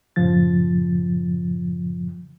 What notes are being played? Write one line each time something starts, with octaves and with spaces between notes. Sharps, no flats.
F#2 A2 C#3 F3 A6